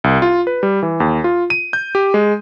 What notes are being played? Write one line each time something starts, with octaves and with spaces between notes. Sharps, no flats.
C2
F4
B4
G3
E3
D#2
F4
D#7
G6
G4
G#3